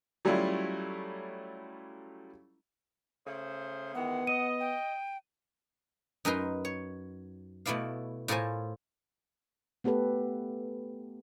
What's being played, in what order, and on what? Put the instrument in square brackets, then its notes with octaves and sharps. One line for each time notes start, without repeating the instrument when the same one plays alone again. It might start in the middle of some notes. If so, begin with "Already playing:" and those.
[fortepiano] F#3 G3 A3 C#4 E4 F4
[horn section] C#3 A3 C5
[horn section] D#3 E3 G#3 [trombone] B3 [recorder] F#5
[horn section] D#5 [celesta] D#7
[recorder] G5
[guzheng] F#2 D#4 A#4 B4 C6
C#5
B2 A3 E4 D5 F5
A2 F4 A4 A#4 C5 G#5
[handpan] A3 B3 G4 A4 B4